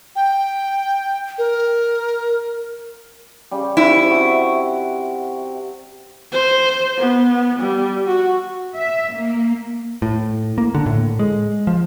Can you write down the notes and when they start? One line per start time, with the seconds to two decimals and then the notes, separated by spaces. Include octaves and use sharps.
0.16 G5
1.38 A#4
3.51 C#3 G3
3.77 C#3 E4 C5
4.11 C3 F#4 E5
6.32 C5
6.97 B3
7.60 G3
8.07 F#4
8.76 E5
9.13 A#3
10.02 A2
10.58 A#3
10.75 D3
10.86 A2
11.19 G#3
11.67 F3